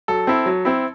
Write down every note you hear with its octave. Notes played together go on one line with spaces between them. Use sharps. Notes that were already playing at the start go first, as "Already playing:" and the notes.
F#3 A4
C4 E4
F#3
C4 E4